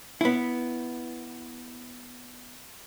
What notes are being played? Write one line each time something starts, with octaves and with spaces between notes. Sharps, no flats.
B3 E4